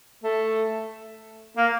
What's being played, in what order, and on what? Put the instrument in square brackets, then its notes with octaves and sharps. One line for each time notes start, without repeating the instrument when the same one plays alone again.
[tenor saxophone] A3
A#3